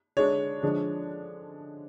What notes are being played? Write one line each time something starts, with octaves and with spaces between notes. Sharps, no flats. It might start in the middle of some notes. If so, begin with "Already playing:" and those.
D3 G#3 D4 C#5
D3 F3 G#3 D4